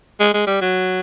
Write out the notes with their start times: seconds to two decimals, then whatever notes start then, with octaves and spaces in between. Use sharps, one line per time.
0.20 G#3
0.34 G#3
0.47 G3
0.61 F#3